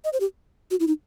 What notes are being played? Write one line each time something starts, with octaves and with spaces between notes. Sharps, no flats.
D#5
C5
G4
F#4
E4
D#4